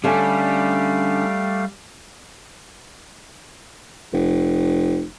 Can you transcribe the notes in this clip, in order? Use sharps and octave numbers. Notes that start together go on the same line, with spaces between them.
D3 G3 A3 C#4 E5 F5
F1